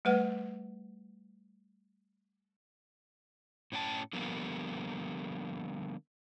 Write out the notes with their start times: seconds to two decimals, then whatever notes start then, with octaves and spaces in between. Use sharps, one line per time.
0.05 G3 A3 B4 F#5
3.72 A2 C#4 G5 A5
4.13 D3 F3 G3 A#3 B3